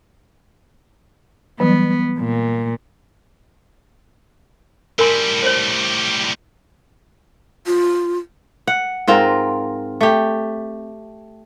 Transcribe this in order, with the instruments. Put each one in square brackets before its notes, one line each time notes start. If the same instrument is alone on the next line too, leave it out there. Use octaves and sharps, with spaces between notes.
[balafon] E3 F#3 G3 [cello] B3
[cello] A#2
[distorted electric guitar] A2 G3 [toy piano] A#4 G#5 C6
[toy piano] C5 C#5
[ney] F4
[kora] F#5
G#2 C4 F4 A#4
A3 G4